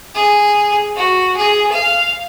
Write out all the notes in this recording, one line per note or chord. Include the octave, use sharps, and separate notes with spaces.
G#4
F#4
G#4
F5